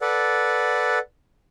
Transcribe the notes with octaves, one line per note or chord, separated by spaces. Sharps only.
A4 B4 D5 F#5